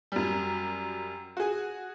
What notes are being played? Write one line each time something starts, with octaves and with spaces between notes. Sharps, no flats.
F#2 G3
F#4 G#4